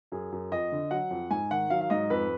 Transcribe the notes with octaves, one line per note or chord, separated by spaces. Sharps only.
F#2 G#4
F#2
F2 D#5
D3
F#3 F#5
F2
G#2 G#5
D#3 F#5
F#3 F5
F5
G#2 D#5
F2 B4